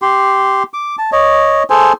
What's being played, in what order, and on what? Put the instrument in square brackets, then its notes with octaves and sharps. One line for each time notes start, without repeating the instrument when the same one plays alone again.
[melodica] G4 C6
D6
A5
C#5 D#5
G#4 A4 C5 G#5